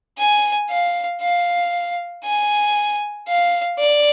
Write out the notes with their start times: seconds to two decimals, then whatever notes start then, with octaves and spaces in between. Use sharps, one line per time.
0.18 G#5
0.70 F5
1.21 F5
2.25 G#5
3.28 F5
3.79 D5